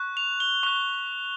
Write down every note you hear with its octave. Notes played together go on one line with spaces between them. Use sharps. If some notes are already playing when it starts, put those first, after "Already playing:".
Already playing: C#6 F#6
F7
G7
C#6 F#6 F7